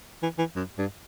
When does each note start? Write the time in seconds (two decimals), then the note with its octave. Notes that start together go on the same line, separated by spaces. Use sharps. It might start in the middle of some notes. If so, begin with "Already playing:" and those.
0.23 E3
0.38 E3
0.56 F#2
0.78 G2